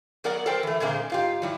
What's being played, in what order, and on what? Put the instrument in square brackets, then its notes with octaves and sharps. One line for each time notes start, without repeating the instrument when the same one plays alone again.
[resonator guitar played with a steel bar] F#3 B3 A#4 D5 F#5
A4 A#4 C5 G5
E3 A3
A#2 D3 G#3 A#3 C4
G#2 F4 G4
F#3 G3 E4